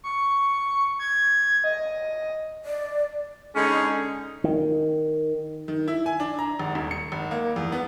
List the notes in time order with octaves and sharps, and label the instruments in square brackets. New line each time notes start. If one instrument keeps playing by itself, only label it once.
[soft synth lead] C#6
G#6
D#5
[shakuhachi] D5
[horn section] D3 G#3 C#4 D#4 G#4
[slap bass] D#3
[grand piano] D#3
E4
G#5
D4
A#5
G#1
D#1
C#7
G#1
A#3
E2
B3